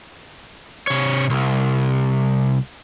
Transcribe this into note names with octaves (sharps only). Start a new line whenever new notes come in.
C3 C#5
C2